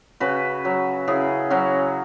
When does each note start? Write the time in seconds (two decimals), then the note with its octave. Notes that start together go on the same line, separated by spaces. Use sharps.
0.20 C#3 F#4 B4
0.65 F#3
1.08 C#3 E4 G#4
1.50 F#3 C#4 F#4